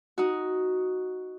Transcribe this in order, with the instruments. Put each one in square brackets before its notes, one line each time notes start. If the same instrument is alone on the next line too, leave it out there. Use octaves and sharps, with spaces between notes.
[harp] D#4 F#4